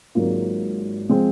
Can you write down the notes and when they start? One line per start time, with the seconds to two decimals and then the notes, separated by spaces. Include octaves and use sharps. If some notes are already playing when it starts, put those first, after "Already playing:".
0.15 G#1 G#2 F#3 A#3 F4
1.09 F3 G#3 C4